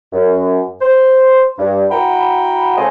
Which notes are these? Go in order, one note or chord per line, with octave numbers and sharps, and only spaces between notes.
F#2
C5
G2
E4 F#4 F#5 G5 A#5 B5
C#3 A3 C5 D#5 F5 G#5